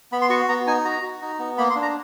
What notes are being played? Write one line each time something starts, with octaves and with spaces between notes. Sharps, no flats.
B3 B5
C6
F#4 C#6
B3 A#5
D#4 G#5
F#4 A#5
F#4
D#4
B3
A#3 B5
C6
D4
A#5